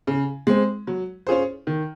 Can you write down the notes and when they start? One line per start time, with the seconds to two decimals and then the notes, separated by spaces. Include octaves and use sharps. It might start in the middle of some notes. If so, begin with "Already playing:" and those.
0.07 C#3
0.47 G#3 C4
0.87 F#3
1.27 C#4 F4 G#4 C5
1.67 D#3